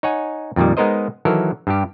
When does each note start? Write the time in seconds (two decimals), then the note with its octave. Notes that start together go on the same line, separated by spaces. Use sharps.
0.03 D#4 C#5 F#5 G#5
0.56 F2 A#2 D#3 G3
0.77 G#3 B3 D#4 A#4 C5 D#5
1.25 D#3 E3 F#3 A4 A#4
1.67 G2 G3 G4